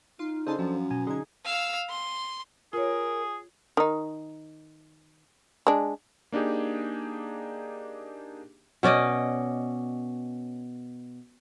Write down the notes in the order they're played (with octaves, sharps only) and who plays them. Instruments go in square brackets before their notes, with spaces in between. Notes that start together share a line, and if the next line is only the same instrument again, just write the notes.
[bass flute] D#4 [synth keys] F4 C6
[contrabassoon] C#3 [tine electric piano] D4 A4 C5 [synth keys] D#5 A5 C6
[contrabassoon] F#2 [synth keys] F3 [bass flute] C#4
[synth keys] B2 [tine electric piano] G#5
[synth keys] D3 G#6 [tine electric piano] D#4 G#4
[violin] F5 E6
C6
[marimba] F4 C#5 [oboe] G#4 [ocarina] A#4
[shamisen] D#3 D#4
G#3 D4
[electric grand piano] A#3 D4 D#4 G4 G#4
[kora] B2 C#4 D5 D#5